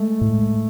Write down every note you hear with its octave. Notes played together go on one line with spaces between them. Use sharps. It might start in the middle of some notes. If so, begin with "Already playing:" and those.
Already playing: G#3 A3
A2